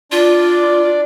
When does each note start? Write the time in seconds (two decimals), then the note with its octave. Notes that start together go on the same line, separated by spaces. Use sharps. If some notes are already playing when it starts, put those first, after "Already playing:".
0.12 D4 F4 D5